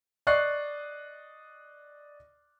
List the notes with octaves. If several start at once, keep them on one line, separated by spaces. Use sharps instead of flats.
D5 D#5 C#6 F#6 C7